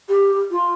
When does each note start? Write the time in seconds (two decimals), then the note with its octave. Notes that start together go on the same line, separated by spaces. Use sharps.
0.09 G4
0.50 F4